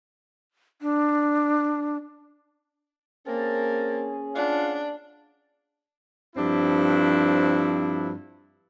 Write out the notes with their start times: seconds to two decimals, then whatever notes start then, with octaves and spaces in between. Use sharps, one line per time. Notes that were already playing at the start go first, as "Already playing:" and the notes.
0.82 D4
3.27 A#3 C4 C#4 G#4 A#4 A5
4.35 D4 F4 F5 F#5
6.36 G2 F3 C4 D4 E4